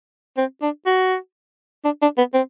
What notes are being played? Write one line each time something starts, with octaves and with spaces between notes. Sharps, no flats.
C4
D4
F#4
D4
D4
B3
C4